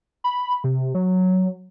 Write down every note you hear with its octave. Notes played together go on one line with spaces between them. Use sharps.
B5
C3
F#3